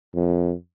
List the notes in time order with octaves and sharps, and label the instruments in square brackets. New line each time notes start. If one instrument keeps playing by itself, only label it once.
[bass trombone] F2